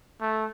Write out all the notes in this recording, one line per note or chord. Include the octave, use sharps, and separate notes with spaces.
A3